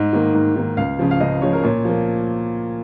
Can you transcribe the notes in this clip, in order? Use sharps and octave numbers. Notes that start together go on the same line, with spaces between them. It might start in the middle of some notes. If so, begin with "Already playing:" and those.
Already playing: G#2 D#5
D#3 A#3
G#2
D#3 A#3
C#2 F5
C#3 F3
F5
C#2 D#5
C#3 F3 C#5
A#4
A#2 C#5
F3 A#3